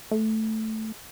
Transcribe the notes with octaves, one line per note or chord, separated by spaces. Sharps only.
A3